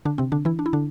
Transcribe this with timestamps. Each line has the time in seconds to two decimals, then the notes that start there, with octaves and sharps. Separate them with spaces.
0.05 D3 D4
0.18 C3 C4
0.32 D3 D4
0.45 E3 E4
0.59 D4
0.66 E4
0.73 D3 D4